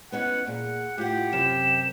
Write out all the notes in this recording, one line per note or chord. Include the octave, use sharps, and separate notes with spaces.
B3 C#4 D#4 F#5
A#2 G#4 F#5
A2 F4 G4 F#5
F#2 C3 E7